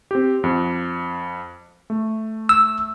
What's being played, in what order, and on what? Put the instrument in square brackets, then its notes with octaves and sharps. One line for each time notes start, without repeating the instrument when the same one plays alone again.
[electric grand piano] C4 G4
F2
A3
[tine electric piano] E6